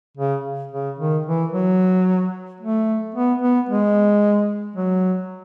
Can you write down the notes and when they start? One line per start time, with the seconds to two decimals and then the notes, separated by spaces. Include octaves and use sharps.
0.17 C#3
0.72 C#3
0.99 D#3
1.26 E3
1.53 F#3
2.60 A3
3.15 B3
3.41 B3
3.69 G#3
4.76 F#3